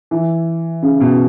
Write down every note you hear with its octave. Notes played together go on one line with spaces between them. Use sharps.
E3
C#3
B2